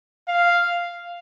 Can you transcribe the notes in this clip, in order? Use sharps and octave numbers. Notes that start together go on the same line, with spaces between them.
F5